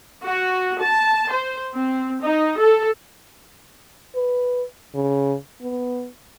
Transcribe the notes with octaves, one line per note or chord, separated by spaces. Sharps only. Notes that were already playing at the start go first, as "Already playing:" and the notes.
F#4
A5
C5
C4
D#4
A4
B4
C#3
B3